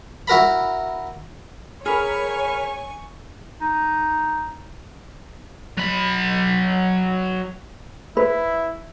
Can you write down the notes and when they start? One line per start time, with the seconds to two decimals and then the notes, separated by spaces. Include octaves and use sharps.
0.28 E4 F#4 A#4 A#5 B5
1.86 G#4 A#4 C#5 G#5 B5 C#6 F6
3.61 D#4
5.77 F#3 B5
8.17 E4 B4